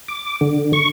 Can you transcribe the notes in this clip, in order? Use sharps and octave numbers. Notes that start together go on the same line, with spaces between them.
D6
D3
C#6